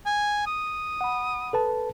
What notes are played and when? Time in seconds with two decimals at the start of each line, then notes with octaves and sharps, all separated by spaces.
0.06 G#5
0.47 D#6
1.01 F#5 B5
1.53 A4 B4 A5